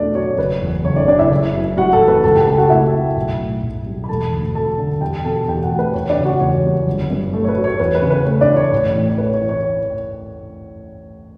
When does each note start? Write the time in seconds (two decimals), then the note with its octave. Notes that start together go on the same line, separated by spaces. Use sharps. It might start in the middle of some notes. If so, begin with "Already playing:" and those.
Already playing: E2 B2 A3 D4 E4 D5
0.15 F#3 C#5
0.38 F#1 B4
0.62 E2
0.85 F#1 C#5
0.96 D4 D5
1.08 C#3 D4 D5
1.19 E4 E5
1.32 F#1
1.54 F#2
1.77 G3 F#4 F#5
1.93 A4 A5
2.00 E3
2.08 B4 B5
2.24 C#2 A4 A5
2.35 G4 G5
2.47 C#3 A4 A5
2.58 F#4 F#5
2.70 A3 E4 E5
2.94 F#3
3.16 B1
3.39 A2
3.63 B1
3.86 G3
4.04 B5
4.09 E1 A4 A5
4.32 D2
4.55 F#3 A4 A5
4.78 D3
5.01 E2 G4 G5
5.24 B2 A4 A5
5.48 E2 G4 G5
5.63 F#4 F#5
5.71 A3
5.79 B4
5.94 E2 C#5
6.10 D4 D5
6.17 C#3
6.25 F#4 F#5
6.40 E2 C#5
6.64 G3
6.87 G1
7.10 G2
7.33 A3
7.44 C#5
7.49 B4
7.56 F#3
7.64 C#5
7.80 E2 B4
7.95 B4
8.02 C#3
8.10 B4
8.25 A3 C#5
8.41 D4 D5
8.49 E3
8.56 C#5
8.72 A1
8.95 A2
9.09 C#5
9.18 A3 B4
9.34 C#5
9.41 E3
9.49 C#5